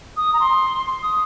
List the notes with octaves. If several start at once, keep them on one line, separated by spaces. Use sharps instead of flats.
D#6
A#5
C6
C6
D#6